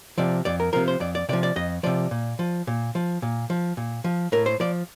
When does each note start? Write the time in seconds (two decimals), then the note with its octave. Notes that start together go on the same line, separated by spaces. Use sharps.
0.18 C3 F3 D5
0.45 F2 D5
0.60 A#4
0.73 C3 F3 A#4
0.88 C5
1.00 F2 D5
1.15 D5
1.29 C3 F3 D5
1.43 D5
1.56 F2 D#5
1.83 C3 F3 D5
2.11 A#2
2.39 F3
2.67 A#2
2.95 F3
3.22 A#2
3.50 F3
3.77 A#2
4.04 F3
4.32 A2 A#4
4.46 C5
4.60 F3 D5